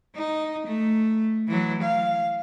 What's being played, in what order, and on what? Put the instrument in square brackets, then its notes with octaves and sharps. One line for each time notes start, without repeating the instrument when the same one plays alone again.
[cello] D#4
A3
E3 F#3
F5